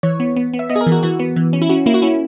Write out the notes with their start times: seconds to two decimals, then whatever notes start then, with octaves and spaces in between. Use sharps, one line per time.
0.03 E3 C#5
0.20 B3
0.37 B3
0.54 B3
0.59 E5
0.69 B3 D#5
0.76 G#4
0.81 A#4
0.87 E3
0.92 F#4
1.03 E3 F#4
1.19 B3
1.36 E3
1.53 C#4
1.62 E4
1.69 C#4 F#4
1.86 A#3 E4
1.94 F#4
2.02 C#4 E4